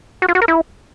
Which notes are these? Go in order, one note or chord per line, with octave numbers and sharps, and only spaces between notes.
F#4
F4
F#4
A#4
E4